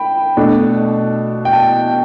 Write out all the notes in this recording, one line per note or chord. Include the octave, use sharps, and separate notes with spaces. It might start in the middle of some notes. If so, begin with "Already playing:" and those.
Already playing: G5 B5
B2 A3 D4
G5
A5